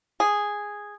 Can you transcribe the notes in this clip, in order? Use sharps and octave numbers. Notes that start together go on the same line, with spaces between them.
G#4